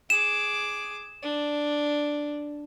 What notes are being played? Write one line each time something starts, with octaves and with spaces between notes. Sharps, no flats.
G#4 D6 E7
D4